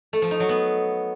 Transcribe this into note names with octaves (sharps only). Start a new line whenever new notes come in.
A3
F3
D#4
F#3
B3